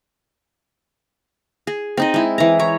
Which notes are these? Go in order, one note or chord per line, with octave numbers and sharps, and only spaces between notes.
G#4
C4 D#4 D#5
G#3 E4
E3 A#5
C#5 A#5